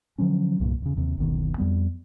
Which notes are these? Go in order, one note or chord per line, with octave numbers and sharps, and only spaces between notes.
D3 F3 F#3 C#4
C2 G2 A#2
E2 C#3
D#2 C3
F#1 D2 B2 D#3
F2 G3 B3